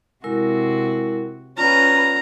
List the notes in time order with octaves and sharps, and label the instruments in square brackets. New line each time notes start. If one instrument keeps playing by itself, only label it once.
[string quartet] C3 F#4 [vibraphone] G#3 E4 A#4
[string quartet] C#4 B4 [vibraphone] F4 D5 F#5 [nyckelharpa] A#5